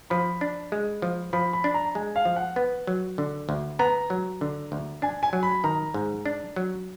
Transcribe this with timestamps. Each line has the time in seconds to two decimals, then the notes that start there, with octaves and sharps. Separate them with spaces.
0.10 F3 B5
0.41 D4
0.72 G#3
1.02 F3
1.33 F3 B5
1.53 B5
1.64 D4
1.74 A#5
1.95 G#3 G#5
2.16 F5
2.25 F3
2.36 F#5
2.56 B3
2.87 F#3
3.18 D3
3.49 D2
3.79 B3 A#5
4.10 F#3
4.41 D3
4.72 D2
5.02 D4 G#5
5.23 G#5
5.33 F#3
5.43 B5
5.64 D#3 A#5
5.94 G#2
6.26 D4
6.56 F#3